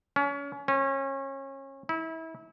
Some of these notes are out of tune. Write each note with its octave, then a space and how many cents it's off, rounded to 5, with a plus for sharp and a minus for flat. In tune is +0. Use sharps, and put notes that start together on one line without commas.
C#4 +30
C#4 -30
E4 -30